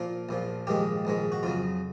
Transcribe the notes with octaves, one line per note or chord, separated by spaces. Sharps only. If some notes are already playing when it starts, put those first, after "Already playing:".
Already playing: A#2 F3 A#4
A#1 A#2 F3
A#1 G#2 D#3 G#3 G4
A#1 G#2 D#3 G#3
F#4
F2 C#3 F#3 F4